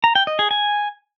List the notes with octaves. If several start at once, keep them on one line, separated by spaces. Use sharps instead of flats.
A#5
G5
D#5
G#4
G#5